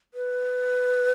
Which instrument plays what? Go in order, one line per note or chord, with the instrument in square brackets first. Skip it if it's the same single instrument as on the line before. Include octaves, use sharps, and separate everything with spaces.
[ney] B4